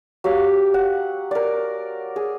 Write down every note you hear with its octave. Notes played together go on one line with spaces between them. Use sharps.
F#3 G4 F5
F#5
A#4 D5
G#4